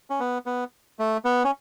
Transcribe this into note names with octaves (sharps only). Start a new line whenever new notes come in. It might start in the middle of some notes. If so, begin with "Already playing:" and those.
C#4
B3
B3
A3
B3
C#4